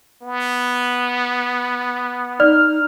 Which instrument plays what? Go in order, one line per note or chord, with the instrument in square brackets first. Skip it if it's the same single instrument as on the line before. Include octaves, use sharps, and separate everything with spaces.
[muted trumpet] B3
[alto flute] D#4 [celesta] D5 [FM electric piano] F6